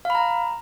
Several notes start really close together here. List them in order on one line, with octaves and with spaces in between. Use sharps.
F5 B5 A#5